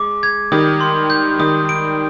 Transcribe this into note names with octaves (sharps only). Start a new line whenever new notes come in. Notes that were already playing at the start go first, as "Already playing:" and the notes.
Already playing: G#3 D6
G#6
D#3 G3 D#6
C6
G6
D#3 G3 D#6
D7